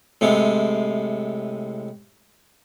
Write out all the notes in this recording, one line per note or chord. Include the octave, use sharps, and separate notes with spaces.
A2 C3 G#3